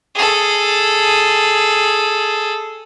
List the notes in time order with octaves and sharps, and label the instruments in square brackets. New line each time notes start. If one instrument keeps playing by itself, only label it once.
[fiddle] G#4 A4